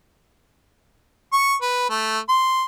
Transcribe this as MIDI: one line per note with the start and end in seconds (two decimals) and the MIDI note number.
1.33 1.54 85
1.62 1.86 71
1.90 2.19 57
2.29 2.64 84